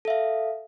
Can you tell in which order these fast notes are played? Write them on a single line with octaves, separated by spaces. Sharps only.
A4 E5 F5